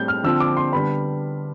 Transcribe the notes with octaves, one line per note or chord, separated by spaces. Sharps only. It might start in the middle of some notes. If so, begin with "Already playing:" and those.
Already playing: A2 G3 C4 G6
F6
D3 F3 C4 E6
D6
C6
D3 G3 B3 B5